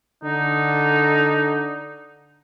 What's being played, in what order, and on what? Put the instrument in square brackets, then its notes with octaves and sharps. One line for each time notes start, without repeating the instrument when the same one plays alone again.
[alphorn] D3 [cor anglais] D#4